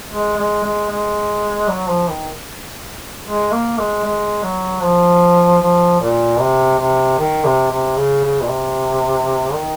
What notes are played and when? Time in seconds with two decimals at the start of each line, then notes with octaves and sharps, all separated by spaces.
0.11 G#3
0.37 G#3
0.64 G#3
0.89 G#3
1.68 F#3
1.88 F3
2.08 D#3
3.25 G#3
3.52 A#3
3.78 G#3
4.05 G#3
4.43 F#3
4.83 F3
5.62 F3
6.01 A#2
6.40 C3
6.79 C3
7.19 D#3
7.45 C3
7.71 C3
7.97 C#3
8.24 C#3
8.42 A#2
8.49 C3
9.54 D#3